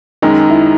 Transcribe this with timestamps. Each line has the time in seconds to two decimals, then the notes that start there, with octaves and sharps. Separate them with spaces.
0.22 F#2 D#3 G#3 D#4
0.49 E4